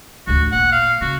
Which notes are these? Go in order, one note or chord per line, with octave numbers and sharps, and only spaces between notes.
A1 D2 F#4
A#2 F#5
F5
C#3 F#4